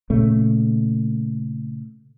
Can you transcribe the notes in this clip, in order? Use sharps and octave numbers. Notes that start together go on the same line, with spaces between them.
A#2 C#3 A3